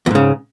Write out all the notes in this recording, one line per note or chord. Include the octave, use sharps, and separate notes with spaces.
E2 G#2 C#3